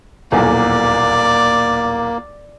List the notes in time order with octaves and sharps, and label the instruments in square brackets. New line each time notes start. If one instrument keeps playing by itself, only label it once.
[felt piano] D#1 B1 E2 [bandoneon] A#3 [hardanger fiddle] D5